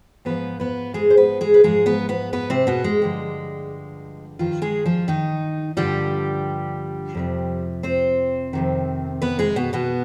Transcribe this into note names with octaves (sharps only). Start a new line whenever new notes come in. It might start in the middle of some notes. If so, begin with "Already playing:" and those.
G#2 F3 B3 B4
B3 B4
G#3 G#4
C5
B3 B4
G#3 G#4
B4
G#2 F3 G#3 G#4
B3 B4
B3 B4
B3 B4
C3 C4
B2 B3
G#3
G2 D3 F3
G2 D#3 F3 F4
G#3 G#4
F3 F4
D#3 D#4
G2 D3 F3 G3 G4
F2 C3 F3
C4 C5
F2 C3 D#3
B3 B4
G#3 G#4
B2 B3
B2 B3